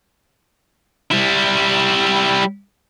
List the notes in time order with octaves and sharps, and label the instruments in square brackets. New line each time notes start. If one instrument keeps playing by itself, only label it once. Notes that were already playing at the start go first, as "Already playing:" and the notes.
[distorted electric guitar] G3 E4